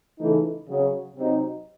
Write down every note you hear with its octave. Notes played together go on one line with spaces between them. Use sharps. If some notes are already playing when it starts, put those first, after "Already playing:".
C#3 E3 A3 D#4 A4
C#3 F#3 C#4
C3 F#3 C4 D#4